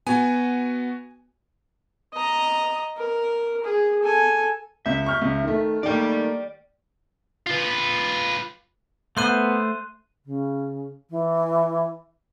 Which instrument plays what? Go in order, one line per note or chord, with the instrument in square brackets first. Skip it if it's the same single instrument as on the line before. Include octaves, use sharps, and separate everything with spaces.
[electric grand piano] B3 F#4 [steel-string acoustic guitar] G#5
[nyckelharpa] D#5 A#5
A#4
G#4
A4 G#5
[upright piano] C#2 G6 [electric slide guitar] E5
[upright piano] C#6 F6 G6
C#2
D#3 A3
[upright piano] D#3 A3 A#3 [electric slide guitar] D5 G5
[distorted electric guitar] F4 B4
[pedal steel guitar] A3 C5 [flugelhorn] B3 [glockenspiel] C6 F#6 D#7
[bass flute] C#3
E3